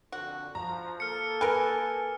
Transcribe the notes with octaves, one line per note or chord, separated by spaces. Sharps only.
F2 D3 F#4
F3 A#5
A#3 A4 F6 C#7
A#4 B4 G#5